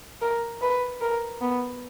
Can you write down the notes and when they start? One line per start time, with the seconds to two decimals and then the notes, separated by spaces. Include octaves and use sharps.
0.22 A#4
0.62 B4
1.01 A#4
1.41 B3